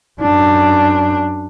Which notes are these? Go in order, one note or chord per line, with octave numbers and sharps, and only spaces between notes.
F#2 D4